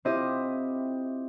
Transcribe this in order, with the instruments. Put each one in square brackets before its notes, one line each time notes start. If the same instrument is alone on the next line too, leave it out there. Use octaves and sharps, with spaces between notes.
[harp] C4 E4 F4 G4 D#5 E5